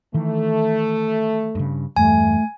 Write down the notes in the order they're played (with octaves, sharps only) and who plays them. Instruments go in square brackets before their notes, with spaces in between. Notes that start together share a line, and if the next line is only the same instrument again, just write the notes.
[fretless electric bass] D#3 E3 [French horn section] A3
[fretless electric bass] G2 C#3
[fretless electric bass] E2 G2 [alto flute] A3 [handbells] G#5